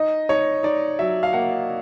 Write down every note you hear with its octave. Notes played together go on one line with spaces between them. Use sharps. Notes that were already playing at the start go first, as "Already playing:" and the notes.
Already playing: D#4 D#5
D#4 C#5
D#4 D5
F#3 E5
F5
A#3 F#5